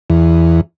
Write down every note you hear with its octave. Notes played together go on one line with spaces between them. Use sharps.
E2